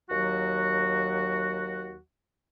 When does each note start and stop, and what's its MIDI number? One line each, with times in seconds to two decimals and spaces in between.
0.10 1.98 39
0.10 1.98 54
0.10 1.98 66